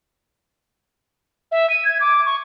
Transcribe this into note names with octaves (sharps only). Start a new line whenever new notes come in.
E5
D#7
G#6
D6
C#6